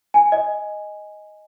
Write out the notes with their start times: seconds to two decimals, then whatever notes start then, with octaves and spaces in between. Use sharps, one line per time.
0.14 G#5
0.32 D#5